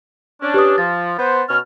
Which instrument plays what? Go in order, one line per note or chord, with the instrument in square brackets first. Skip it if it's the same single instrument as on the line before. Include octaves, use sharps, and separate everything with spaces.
[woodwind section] C#4 D4
[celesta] G4 B4 D#6
[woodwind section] F3 [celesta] A6
[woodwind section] B3 C5
B2 C#4 F6